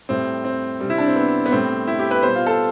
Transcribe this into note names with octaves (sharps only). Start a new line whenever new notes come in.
A2 G3 C4
C4
C3 G3
E4
D4
C4
B3
B3
A2 G3 C4
E4
G4
B4
B2 G3 C5
F4
A4